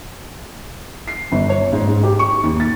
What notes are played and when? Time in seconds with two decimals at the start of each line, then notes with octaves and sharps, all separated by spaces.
1.08 C7
1.32 G1
1.49 C#5
1.73 G#2
1.88 G#2
2.03 G4
2.19 C#6
2.43 D#2
2.60 A6